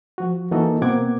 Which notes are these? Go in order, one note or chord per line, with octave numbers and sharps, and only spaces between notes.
F3 F#4
E3 A#3 D#4 F#4 A4 D#5
B2 A#3 C4 F#5 D6 G#6